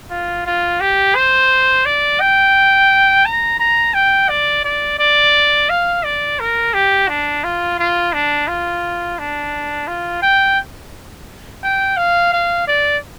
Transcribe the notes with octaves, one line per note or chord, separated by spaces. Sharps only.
F4
F4
G4
C5
D5
G5
A#5
A#5
G5
D5
D5
D5
F5
D5
A#4
G4
D4
F4
F4
D4
F4
D4
F4
G5
G5
F5
F5
D5